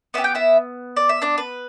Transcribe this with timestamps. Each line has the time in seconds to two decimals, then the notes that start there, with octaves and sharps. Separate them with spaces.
0.14 B3 D4 G4 E5
0.24 G5
0.35 E4 E5
0.97 D5
1.09 E5
1.22 D4 D5
1.38 B4